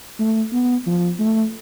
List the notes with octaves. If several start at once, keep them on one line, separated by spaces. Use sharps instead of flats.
A3
B3
F3
A3